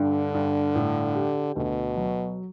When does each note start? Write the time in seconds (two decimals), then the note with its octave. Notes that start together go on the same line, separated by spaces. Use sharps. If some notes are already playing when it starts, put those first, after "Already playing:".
Already playing: G2 D3
0.34 G2
0.75 A2
1.16 G4
1.56 D2 B2
1.96 F#3